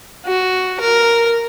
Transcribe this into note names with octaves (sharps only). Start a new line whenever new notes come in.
F#4
A#4